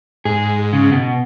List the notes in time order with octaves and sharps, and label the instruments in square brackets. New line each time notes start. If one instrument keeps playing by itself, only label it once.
[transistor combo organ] G#2 [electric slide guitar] G#4
[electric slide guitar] C#3
B2